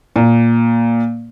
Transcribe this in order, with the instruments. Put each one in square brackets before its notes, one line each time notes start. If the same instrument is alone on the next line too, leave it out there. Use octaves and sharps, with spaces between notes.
[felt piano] A#2